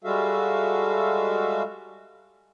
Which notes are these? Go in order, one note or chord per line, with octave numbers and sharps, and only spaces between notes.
G3 G#3 F#4 A4 E5 F5